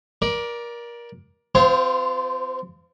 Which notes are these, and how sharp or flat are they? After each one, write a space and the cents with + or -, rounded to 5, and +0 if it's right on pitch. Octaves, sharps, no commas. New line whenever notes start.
A#4 +25 D5 +0
C4 -40 F4 -15 C5 +0